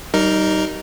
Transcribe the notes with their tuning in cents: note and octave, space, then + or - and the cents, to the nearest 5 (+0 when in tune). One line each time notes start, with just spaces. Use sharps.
G3 -35 D#4 +0 A#4 +0